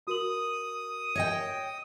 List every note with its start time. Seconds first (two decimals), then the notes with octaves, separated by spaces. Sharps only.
0.08 F#4 A#4 D#6 F#7
1.15 C#5 D#5 G5